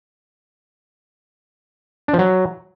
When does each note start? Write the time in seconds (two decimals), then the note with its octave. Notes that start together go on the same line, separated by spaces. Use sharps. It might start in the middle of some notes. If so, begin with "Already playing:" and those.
2.08 D4
2.14 F3
2.19 F#3